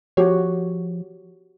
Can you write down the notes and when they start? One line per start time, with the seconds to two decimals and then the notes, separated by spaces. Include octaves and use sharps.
0.17 F3 F#4 G4 C#5